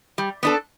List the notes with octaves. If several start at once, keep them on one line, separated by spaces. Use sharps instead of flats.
G3
B3 D4 A4